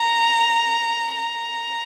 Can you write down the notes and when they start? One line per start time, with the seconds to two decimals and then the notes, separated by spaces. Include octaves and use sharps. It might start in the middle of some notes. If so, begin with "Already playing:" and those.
Already playing: A#5
1.17 A#5